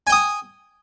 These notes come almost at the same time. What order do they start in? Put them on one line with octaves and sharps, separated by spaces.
G#5 G5 D#6